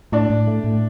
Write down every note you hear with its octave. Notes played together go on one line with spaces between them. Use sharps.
A2 D4 D5
A2
A3
A2